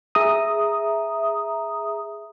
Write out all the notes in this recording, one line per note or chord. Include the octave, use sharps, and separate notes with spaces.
G#4 E5 A#5 D#6